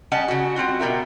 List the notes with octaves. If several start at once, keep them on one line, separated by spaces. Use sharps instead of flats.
G3 C#4 D#5 F#5 A5
C#3 F#4
G3 C4 F4 F#4
B2 B3 G4 A#4 E5